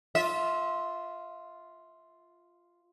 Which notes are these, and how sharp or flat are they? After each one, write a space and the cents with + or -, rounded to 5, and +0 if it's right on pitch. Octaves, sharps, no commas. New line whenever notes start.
F4 +0 E5 -30